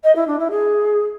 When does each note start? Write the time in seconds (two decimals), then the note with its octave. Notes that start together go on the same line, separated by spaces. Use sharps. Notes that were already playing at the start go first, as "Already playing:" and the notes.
0.03 D#5
0.15 E4
0.27 D4
0.39 E4
0.50 G#4